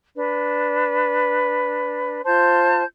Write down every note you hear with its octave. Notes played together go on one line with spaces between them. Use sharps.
D4 B4
F4 C5 A5 G6